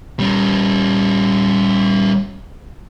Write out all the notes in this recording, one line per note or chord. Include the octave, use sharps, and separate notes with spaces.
G3 C#4